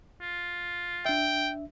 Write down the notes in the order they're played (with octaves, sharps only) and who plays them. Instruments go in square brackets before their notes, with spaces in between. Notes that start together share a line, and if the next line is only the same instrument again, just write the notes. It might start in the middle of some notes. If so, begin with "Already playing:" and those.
[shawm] F4
[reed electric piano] D4 E5 [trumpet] G5